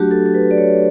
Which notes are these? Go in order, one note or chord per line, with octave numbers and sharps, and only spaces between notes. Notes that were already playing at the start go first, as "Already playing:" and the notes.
Already playing: F#3 A3 D4 F#4 G4
A4
A4
B4
D5
C#5